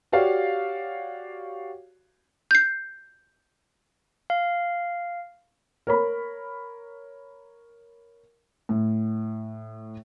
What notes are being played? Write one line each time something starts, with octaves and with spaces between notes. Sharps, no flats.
F#4 G4 C#5 D5 F5
G6 C7
F5
A#4 C#5 B5
A2